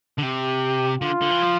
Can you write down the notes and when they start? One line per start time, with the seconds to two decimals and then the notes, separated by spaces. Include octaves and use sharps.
0.18 D3
0.22 C3 G4
1.01 D3 F4
1.21 D3
1.31 E3
1.42 F3